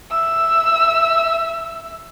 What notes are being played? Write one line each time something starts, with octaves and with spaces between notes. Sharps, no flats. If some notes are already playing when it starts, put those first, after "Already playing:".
E5 E6